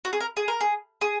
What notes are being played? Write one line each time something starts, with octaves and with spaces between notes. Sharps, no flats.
F#4
G#4
A#4
G#4
A#4
G#4
G#4